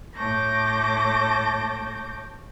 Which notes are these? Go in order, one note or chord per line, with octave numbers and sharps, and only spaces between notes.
A2 C#5 A5 D6 G6 A#6